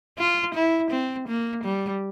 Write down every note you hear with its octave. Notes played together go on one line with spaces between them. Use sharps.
F4
E4
C4
A#3
G3